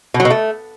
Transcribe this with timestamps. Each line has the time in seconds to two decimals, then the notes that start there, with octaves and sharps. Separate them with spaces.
0.14 B2
0.20 F#3
0.25 B2
0.30 A3